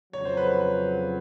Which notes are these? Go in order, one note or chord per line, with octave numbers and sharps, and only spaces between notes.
F2 C#3 F#3 C#5
C5
B4